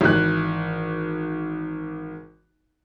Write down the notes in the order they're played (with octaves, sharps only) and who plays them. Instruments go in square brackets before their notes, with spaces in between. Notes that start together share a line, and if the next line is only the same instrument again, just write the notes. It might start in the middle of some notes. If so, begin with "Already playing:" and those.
[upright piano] G#1 E3 F#6